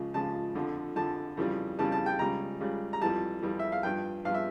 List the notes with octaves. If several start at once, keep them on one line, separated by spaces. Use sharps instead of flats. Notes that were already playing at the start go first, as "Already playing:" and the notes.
Already playing: C#2 C#3 F3
C#2 C#3 F3 A5
F2 D3 F3
F2 D3 F3 A5
F2 C#3 E3 G3
F2 C#3 E3 G3 A5
A5
G5
C#2 C#3 G3 A#5
C#2 C#3 G3
A#5
F2 E3 G3 A5
F2 E3 G3
E5
F5
G2 F3 G5
G2 F3 F5
E5